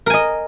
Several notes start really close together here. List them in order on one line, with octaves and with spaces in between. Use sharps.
A#4 G#5 D#5